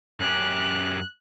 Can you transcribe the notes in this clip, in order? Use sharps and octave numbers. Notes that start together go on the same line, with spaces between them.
F#2 C#4 G4 F#6